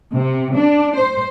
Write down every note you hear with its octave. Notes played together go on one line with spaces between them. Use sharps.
C3
D4
C5